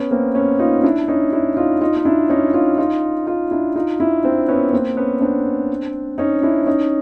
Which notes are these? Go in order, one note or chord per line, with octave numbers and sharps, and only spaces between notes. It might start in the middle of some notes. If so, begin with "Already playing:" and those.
Already playing: B3 C#4
A#3 C4
B3 C#4
D#4 F4
D4 E4
C#4 D#4
D4 E4
D#4 F4
D#4 F4
D#4
D4 E4
C#4 D#4
D#4 F4
D#4 F4
D#4 F4
D4 E4
D#4 F4
D4 E4
C4 D4
B3 C#4
A#3 C4
B3 C#4
C4 D4
C#4 D#4
D4 E4
C#4 D#4